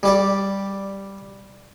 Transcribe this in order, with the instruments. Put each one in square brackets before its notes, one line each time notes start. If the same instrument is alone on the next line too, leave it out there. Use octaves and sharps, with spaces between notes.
[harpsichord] G3 G4 D5